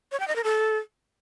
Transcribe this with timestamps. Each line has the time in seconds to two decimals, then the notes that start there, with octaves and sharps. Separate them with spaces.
0.12 C#5
0.20 G5
0.28 D#5
0.36 A#4
0.44 A4